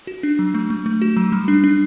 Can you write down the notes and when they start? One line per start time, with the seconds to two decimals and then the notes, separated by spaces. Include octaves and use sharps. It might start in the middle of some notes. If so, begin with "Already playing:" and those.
0.07 F#4
0.23 D4
0.39 F#3
0.54 A3
0.70 A3
0.86 A3
1.02 F#4
1.17 F#3
1.32 G3
1.48 D4
1.64 D4